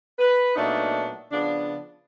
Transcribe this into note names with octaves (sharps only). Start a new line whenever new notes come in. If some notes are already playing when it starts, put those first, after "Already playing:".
B4
A#2 F#3 A3 B3 D4 D#4
C#3 F3 B3 D4